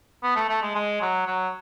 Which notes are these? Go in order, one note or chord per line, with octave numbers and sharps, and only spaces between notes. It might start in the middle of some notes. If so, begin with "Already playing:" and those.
B3
A3
A3
G#3
G#3
F#3
F#3